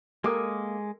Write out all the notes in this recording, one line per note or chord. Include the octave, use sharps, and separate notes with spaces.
G#3 A#3 G4 A4 A#4 D6 D#6